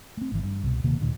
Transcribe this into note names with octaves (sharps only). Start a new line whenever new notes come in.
A3 C4
G#1 E3
G2
C2 B2
D#1 C3 D#3 A#3
D#1 D2 A#2 D#3